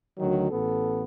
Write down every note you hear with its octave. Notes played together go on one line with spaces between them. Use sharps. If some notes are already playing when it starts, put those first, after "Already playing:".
D2 D#3 F#3
A1 B3 A4